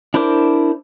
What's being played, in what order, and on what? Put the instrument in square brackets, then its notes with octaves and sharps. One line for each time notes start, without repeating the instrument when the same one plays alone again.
[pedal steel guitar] D4 E4 A#4 C5 D6